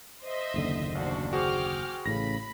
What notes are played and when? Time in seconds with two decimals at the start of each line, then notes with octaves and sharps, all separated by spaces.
0.24 C5 D#5 E5
0.54 F#1 D#2 D3
0.95 A1 D4 F#4 C5
1.33 F#4 G#4 C5 G5 D6 F6
2.06 A1 A2 C#3 B5 A#6